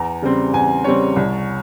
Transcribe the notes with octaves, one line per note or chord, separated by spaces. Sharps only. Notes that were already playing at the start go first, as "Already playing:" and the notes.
Already playing: E2 A#5
C#3 G3 C4
E2 G#5
C#3 G3 C4 C#5
C2